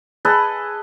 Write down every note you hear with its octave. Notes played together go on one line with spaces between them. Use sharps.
G#4 A4 B4 D#5